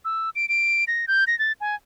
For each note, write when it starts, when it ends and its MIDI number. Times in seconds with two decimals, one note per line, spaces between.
0.05 0.30 88
0.35 0.48 98
0.49 0.84 98
0.88 1.05 94
1.08 1.24 91
1.27 1.37 94
1.39 1.52 93
1.61 1.75 80